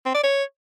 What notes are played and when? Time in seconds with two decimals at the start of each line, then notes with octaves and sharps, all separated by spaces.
0.05 C4
0.14 D5
0.23 C#5